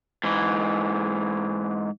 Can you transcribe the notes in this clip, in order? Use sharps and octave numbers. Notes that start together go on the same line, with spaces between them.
G#2 E3